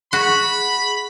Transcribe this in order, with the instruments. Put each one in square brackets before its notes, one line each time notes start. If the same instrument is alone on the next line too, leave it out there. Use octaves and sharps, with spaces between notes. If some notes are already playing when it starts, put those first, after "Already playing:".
[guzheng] F#4 [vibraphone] G#4 [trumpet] B5